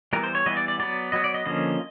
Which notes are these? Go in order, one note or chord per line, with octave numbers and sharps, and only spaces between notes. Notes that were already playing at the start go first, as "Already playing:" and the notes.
E3 G3 B3 A#4
C5
C#5
E3 G3 B3 D#5
D5
D5
F#3 B3 D5
F#3 B3 D#5
D5
D#5
D3 F3 A#3 C#4 D#5